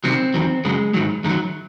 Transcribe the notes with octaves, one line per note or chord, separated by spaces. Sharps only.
C2 C3 D#3 F#3 C4
E2 D#3 F#3
F#2 C#3 F#3 G#3
G#2 D#3 F#3
F#2 D#3 F#3 G#3